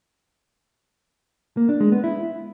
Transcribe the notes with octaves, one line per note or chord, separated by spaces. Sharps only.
A#3
D4
G#3
B3
E4